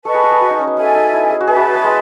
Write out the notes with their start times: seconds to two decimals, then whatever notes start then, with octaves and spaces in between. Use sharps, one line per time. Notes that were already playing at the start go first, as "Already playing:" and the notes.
0.05 A4 B4 D#5 A5 C#6
0.14 G#4
0.23 A4
0.32 G#4
0.41 F#4
0.50 D#4
0.59 C#4
0.67 B3
0.77 C#4 A4 E5 G#5
0.95 D#4
1.13 E4
1.30 G#4
1.40 F#4
1.47 G#4 B4 E5 A5
1.56 F#4
1.75 B3
1.84 G#3